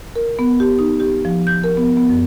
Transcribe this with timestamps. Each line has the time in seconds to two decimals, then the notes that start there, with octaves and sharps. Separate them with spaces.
0.16 A#4
0.39 B3
0.60 G4
0.79 D#4
1.00 G4
1.25 F3
1.47 G6
1.64 A#4
1.77 B3
1.97 B3
2.10 F#2